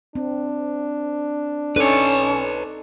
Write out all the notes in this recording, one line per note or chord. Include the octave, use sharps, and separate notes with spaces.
C4 D4
C#4 D#4 A4 B4 C#5 D5